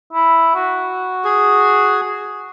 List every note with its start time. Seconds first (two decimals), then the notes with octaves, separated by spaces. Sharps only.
0.13 E4
0.55 F#4
1.25 G#4